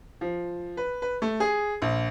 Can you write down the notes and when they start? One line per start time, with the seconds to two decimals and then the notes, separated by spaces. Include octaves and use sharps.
0.21 F3
0.77 B4
1.02 B4
1.22 A3
1.40 G#4
1.82 A#1